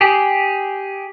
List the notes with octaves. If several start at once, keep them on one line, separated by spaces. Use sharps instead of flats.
G4 G#4